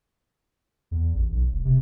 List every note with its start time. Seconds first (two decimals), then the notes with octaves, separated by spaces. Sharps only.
0.91 E2
1.14 A1
1.32 B1
1.52 E1
1.65 C3